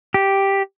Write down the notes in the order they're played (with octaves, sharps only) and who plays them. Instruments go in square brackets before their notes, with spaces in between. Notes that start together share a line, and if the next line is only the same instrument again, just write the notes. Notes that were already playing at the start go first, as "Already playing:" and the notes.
[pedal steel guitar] G4